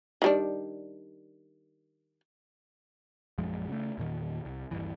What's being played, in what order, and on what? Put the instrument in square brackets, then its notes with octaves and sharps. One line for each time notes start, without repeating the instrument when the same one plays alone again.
[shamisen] D#3 G3 D4
[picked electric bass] A#1 F#2 F3 G#3
C#3 A3
E2 A#2 D#3
C2
D#1 G2 E3